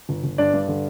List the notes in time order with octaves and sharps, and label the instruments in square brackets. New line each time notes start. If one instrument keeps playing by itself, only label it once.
[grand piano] G1
G1
G2 D4 D5
G2
D3